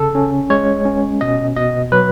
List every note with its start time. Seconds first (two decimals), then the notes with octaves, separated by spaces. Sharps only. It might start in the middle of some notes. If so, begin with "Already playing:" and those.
Already playing: C#3 A4
0.15 C#4
0.50 G#3 C#5
0.85 C#4
1.21 B2 D#5
1.56 B2 D#5
1.92 F#3 B4